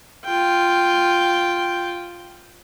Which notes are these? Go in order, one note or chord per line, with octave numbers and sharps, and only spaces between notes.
F4 G5